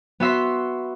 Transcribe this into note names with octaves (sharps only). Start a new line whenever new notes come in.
B3 F#4 E5 C6 B6